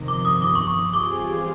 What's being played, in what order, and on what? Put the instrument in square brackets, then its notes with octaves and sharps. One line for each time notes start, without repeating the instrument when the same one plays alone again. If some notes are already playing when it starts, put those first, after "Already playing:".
Already playing: [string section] G1 F2 C3 D#3
[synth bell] D6
D#6
D6
C#6
C#6
[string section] E3 G3 C4 F4 G#4 [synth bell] D6